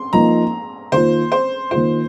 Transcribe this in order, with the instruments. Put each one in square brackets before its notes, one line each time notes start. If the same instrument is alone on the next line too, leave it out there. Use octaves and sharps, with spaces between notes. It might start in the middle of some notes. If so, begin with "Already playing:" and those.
Already playing: [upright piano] C6
[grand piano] F3 A#3 D#4 [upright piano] A#5
[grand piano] D#3 A#3 F4 [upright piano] C5
[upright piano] C5
[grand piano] D#3 A#3 F4 [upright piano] C5